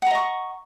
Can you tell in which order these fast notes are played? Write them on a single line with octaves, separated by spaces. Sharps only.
F#5 A#5 D#5 C#6